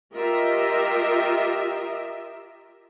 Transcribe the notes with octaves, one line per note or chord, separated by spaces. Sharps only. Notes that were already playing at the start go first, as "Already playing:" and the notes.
F4 G4 A#4 D#5 E5